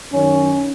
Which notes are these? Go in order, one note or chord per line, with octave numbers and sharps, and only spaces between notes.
F#2 D#3 C#4